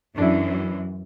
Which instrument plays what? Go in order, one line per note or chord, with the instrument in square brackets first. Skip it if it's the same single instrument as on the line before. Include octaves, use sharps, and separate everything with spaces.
[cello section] F#2 E3 [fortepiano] D4 E4